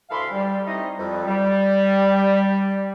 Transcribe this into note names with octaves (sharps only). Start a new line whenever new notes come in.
D2 E3 A4 F5 B5 C6
G3
A3 C4 D#4 E4 D#5
F2 G3
G3